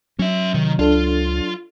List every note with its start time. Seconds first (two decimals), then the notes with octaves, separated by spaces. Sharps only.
0.19 F#3 C#4 E5
0.54 C3 D#3
0.79 C#2 D4 F4 A4